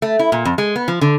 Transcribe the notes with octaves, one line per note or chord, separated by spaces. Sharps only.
A3
E4
A#2
F2
G#3
B3
F3
D3